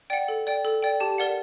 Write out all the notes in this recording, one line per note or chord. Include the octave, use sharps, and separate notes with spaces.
D5 F#5 G5
A4
D5 G5
A4
D5 G5
G4 A5
A#4 D5 F#5